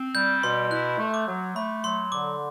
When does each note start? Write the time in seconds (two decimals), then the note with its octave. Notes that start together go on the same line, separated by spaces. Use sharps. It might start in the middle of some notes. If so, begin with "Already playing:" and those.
Already playing: C4
0.15 G3 G6
0.43 B2 C6
0.71 E4 F#6
0.99 A3
1.14 D6
1.27 F#3
1.55 A3 B5
1.84 F#3 C6
2.12 D3 D6